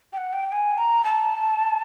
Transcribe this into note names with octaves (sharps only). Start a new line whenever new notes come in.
G5
F#5
G5
G#5
A#5
A5